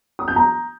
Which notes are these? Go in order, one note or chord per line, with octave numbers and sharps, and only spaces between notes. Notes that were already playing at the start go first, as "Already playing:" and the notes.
D#6
G6
A#5